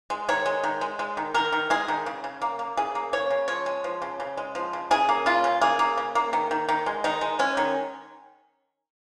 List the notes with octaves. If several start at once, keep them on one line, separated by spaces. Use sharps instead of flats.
G#3
D#3 C#5
G#3
D#3
G#3
G#3
D#3
D#3 A#4
D#3
G#3 G#4
D#3
C#3
C#3
A#3
A#3
C#3 G#4
A#3
C#3 C#5
C#3
F3 C#5
G#3
F3
C#3
C#3
G#3
F3
C#3
C#3 G#4
A#3
C#3 F4
C#3
A#3 G#4
A#3
C#3
A#3
D#3
D#3
D#3
G#3
D#3 D#4
G#3
G#3 C#4
D#3